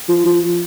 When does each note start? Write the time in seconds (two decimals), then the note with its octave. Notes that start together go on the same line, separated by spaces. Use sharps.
0.09 F3
0.26 F3